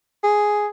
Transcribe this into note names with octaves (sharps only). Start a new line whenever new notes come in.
G#4